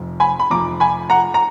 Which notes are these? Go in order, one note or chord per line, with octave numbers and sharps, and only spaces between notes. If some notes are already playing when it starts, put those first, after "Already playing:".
Already playing: F1 F2
G#5 B5
B5
F1 F2 F3 A#5 D6
G#5 B5
F#5 A#5
A#5